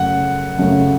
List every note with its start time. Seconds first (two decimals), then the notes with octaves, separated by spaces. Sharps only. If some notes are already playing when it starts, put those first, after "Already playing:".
Already playing: F#2 C#3 A3 F#5
0.58 F#2 C#3 A3